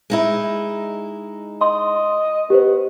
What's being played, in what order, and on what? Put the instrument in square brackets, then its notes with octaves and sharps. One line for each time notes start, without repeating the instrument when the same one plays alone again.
[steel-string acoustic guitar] G#3 D#4 E4
[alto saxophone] D#5 [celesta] C6
[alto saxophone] B3 [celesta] G4 B4 C5